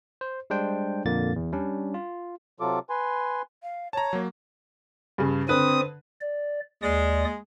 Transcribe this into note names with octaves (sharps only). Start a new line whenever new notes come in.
C5
G3 G#3 D4 C5 G5
F2 A#2 D3 A#3 A6
E2
G3 C#4 D4
F4
C3 F#3 F4 A4 D6
B4 G#5 C6
F5
C#5 A5 A#5
F#3 A#3
G2 C#3
D3 C4 B4 D#6
D5
D#2 G#3 D5 D#6